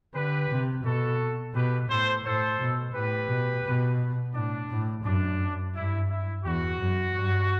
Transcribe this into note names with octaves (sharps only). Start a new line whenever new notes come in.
D3 G4 B4
C3
B2 F#4 A4
B2 G4 B4
A2 A4 C5
A2 A4 C5
B2
A2 G4 B4
B2
B2
A2 D4
A2
F#2 D4
G2 E4
E4
E2 F#4
F#2
G2